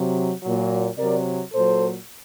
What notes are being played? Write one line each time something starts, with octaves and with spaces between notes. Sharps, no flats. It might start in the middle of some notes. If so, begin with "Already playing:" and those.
Already playing: C3 F#3
A#2 F#3
C3 F#3 A#4 D5
A#2 F#3 A4 C5